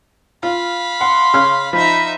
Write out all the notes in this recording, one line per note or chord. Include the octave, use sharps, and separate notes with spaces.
F4 F5 B5
F#5 C6
C#3 C#4 F6
F3 D#4 E5 B5